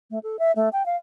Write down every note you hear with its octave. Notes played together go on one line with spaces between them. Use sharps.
A3
A4
E5
A3
G5
F5